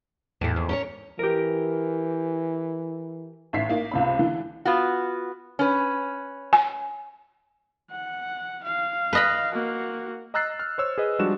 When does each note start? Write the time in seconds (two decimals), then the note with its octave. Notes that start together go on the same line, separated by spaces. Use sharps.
0.41 E2 A2 E3
0.56 F2
0.69 C#4 A#4 C#5
1.19 E3 G4 A#4
3.53 A1 D#4 E5 B6 C7
3.69 A#3 D#4
3.91 C#2 C3 B5
4.19 D3 E3
4.65 B3 F4 F#4
5.59 C#4 B4
6.53 G#5
7.91 F#5
8.63 F5
9.13 B4 D#5 B5
9.53 A#3 F#4
10.34 D#5 A#5 E6 F#6 A6 C7
10.59 F6
10.78 C5 C#5 E6
10.98 G#4 B4 D#5
11.19 F3 G3 G#3 D4 F#4 E7